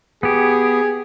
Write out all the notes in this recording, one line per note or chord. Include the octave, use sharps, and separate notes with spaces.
B3 G4 G#4